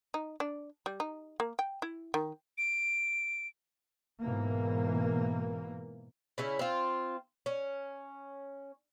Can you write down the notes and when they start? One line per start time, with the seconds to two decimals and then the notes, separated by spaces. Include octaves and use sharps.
0.14 D#4
0.40 D4
0.86 G3
1.00 D#4
1.40 A#3
1.59 G5
1.82 E4
2.14 D#3
2.58 D7
4.21 G#2 B2 E3 A#3
6.38 C#3 C#4 E4
6.59 C4 F4
7.46 C#4